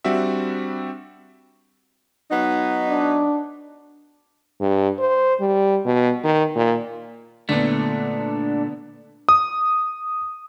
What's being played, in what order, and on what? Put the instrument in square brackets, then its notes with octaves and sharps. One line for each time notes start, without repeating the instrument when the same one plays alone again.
[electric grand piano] G3 C4 D4 F#4 E5
[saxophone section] F#3 B3 D#4
[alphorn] D4
[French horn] G2
C5
G3
B2
D#3
A#2
[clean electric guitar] A#2 A3 [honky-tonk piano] D3 B3 [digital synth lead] D4
[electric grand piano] D#6